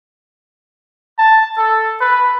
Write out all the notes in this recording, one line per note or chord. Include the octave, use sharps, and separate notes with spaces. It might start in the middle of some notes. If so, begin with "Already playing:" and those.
A5
A4
B4